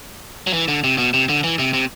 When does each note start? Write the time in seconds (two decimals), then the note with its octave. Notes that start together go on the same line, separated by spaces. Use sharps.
0.47 F#3
0.53 E3
0.68 D3
0.84 C3
0.98 B2
1.14 C3
1.29 D3
1.44 E3
1.59 C3
1.74 C3